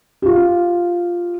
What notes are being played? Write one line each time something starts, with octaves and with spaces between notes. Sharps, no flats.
F4 G4